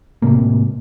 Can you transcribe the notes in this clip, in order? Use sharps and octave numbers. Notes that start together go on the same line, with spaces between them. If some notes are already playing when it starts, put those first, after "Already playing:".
A2 C3 G#3 A#3